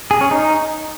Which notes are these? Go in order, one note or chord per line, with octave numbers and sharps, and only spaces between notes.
G#4
C#4
D#4